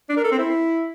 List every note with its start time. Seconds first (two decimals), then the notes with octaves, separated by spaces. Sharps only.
0.09 D4
0.17 A#4
0.24 A4
0.31 C4
0.39 E4